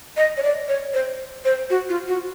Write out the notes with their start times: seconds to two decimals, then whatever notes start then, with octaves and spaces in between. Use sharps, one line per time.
0.17 D#5
0.37 C#5
0.43 D5
0.68 C#5
0.94 C5
1.45 C5
1.70 F#4
1.89 F4
2.08 F#4